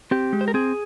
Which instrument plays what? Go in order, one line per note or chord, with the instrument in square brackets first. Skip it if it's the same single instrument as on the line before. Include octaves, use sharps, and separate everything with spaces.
[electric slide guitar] C4 G4
G#3
C5
A#4
C4 G#4